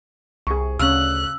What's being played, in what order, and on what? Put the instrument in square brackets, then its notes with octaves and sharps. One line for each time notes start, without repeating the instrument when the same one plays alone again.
[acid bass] C2 [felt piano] G#4 C#6
[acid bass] D2 [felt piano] C#3 C#4 [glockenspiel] E6 [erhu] F#6